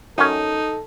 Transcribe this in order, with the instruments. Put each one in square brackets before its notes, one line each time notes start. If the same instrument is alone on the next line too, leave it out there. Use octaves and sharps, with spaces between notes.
[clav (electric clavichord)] F#2 C#4 [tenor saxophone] D#4 [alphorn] A4